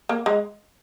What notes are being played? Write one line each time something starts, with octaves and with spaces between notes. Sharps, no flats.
A#3
G#3